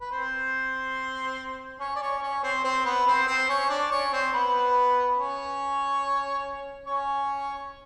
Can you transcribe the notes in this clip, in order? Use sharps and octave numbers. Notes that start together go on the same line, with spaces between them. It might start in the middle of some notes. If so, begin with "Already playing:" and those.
B4
C4 C5
C#4 C#5
D5
C#4 C#5
C#4 C#5
C4 C5
C4 C5
B3 B4
C4 C5
C4 C5
C#4 C#5
D4 D5
C#4 C#5
C4 C5
B3 B4
C#4 C#5
C#4 C#5